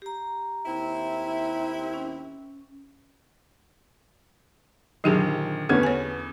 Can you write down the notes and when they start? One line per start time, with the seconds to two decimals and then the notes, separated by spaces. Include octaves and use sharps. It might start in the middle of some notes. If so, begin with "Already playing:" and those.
0.02 G4 A#5
0.66 D#2 C4 E4
1.94 C#4
5.04 A#1 D3 D#3 F#3 G4 G#4
5.69 E2 D3 B3 C#4 G4 F6 G#6
5.83 C#5 G#5